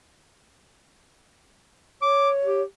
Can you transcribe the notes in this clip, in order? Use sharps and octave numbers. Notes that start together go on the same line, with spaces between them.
C#5 D6
G4